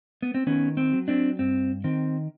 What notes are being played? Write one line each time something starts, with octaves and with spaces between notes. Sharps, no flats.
B3
C4
D#3 B3 C#4
C4
F#3
C4 D4
G2 C4
D#3 C4